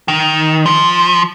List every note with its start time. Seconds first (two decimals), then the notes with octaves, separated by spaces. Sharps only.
0.08 D#3
0.66 F3